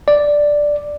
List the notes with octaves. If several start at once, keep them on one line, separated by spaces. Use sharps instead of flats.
D5